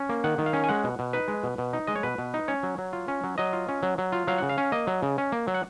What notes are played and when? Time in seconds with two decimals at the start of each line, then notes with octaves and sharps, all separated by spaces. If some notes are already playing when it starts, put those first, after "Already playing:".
Already playing: C#4
0.09 A#3
0.24 D#3 F#5
0.38 D#3
0.46 F5
0.53 C#4
0.64 G#5
0.69 G#3 F#5
0.84 B2
0.99 B2
1.13 D#4 B4
1.28 G#3
1.44 B2
1.58 B2
1.73 D#4
1.87 G#3 D#5
1.96 C#5
2.03 B2 B4
2.18 B2
2.34 D#4
2.48 C#4 C#5
2.63 F#3
2.78 F#3
2.93 F4
3.08 C#4
3.24 F#3
3.38 F#3 D#5
3.53 F4
3.69 C#4
3.83 F#3
3.98 F#3
4.12 F4
4.27 F#3 F5
4.38 C#3 F#5
4.49 F5
4.58 C#4
4.72 A#3 D#5
4.87 F#3
5.03 C#3
5.18 C#4
5.32 A#3
5.47 F#3
5.54 F#5